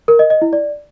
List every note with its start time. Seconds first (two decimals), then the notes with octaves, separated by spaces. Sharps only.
0.08 A#4
0.19 D#5
0.30 D#5
0.42 E4
0.53 D5